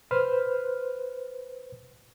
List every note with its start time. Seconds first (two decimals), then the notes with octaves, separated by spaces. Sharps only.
0.11 B4 C5 F6